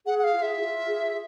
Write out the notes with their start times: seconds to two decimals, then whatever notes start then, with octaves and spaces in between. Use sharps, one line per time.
0.06 G#4 F#5
0.19 F#5
0.24 F5
0.33 F4
0.42 E5
0.60 F4
0.87 G#4